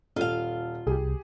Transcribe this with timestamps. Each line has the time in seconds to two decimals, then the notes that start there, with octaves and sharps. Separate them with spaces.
0.16 D#1 F4 A4 F5 D#7
0.87 C2 G4 G#4